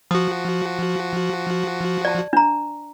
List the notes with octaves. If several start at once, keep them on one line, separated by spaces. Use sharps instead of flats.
F3 F#4 D#6
D5 A5
D4 A#5